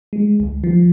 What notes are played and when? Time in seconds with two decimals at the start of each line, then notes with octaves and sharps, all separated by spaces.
0.13 G#3
0.40 C#2
0.64 F3